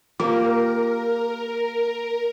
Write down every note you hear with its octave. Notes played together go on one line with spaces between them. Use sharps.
A#3 F4 G4 A#4